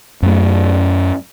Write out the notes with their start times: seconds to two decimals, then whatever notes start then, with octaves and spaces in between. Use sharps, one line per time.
0.22 F#2 A3